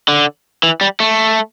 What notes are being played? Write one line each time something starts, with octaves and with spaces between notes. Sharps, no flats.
D3
E3
G3
A3